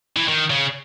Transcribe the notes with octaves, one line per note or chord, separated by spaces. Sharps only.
E3
D#3
C#3